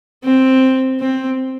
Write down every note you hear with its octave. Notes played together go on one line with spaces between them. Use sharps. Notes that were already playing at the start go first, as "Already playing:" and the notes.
C4
C4